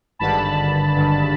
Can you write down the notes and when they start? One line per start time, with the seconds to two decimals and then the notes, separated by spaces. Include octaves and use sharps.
0.19 G#1 G2 D3 A5 B5
0.95 G#1 G2 D3